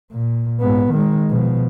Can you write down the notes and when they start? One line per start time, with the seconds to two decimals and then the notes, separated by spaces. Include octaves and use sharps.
0.12 A#2
0.61 G#2 B3
0.91 D#3 G#3
1.30 B2 F3